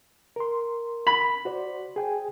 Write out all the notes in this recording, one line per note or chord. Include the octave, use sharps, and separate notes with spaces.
A#4 C6
B5
F#4 C5 D5
G#4 G5 G#5